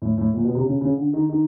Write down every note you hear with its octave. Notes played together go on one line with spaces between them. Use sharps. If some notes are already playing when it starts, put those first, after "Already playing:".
A2
A2
A#2
B2
C3
C#3
C#3
D3
D#3
D#3